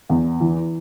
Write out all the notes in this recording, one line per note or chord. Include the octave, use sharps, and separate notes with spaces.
E2
E3